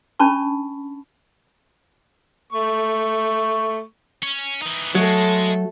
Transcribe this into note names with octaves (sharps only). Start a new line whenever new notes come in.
C#4 D4 A5 B5 C#6
A3 C#6
C#4
E3 D#4
F#3 G#3 A3 A4